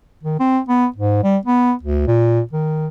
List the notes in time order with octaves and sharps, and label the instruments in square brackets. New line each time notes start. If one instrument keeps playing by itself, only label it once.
[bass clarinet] D#3
C4
B3
G#2
G3
B3
D2
A#2
D#3